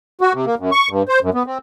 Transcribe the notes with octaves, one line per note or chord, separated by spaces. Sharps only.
F#4
C3
A#3
F#2
C#6
G2
C5
F#2
B3
C4